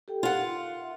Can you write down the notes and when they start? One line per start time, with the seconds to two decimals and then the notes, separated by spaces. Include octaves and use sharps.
0.08 G4 A4 G5
0.23 D#4 F4 G4 A#4 F#5
0.45 F5
0.79 A#4 E5